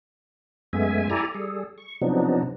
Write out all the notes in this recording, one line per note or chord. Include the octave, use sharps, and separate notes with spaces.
F#2 G#3 A3 B3 E5 G#5
E4 G4 A4 D5 G#5 A#5
G3 G#4 A4
C#6
C3 F3 F#3 B3 D4 D#4